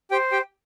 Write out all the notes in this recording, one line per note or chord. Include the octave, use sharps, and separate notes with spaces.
G4 C5 G5
G4 G5